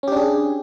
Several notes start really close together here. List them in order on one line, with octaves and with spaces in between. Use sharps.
C#4 G4 D4 G#4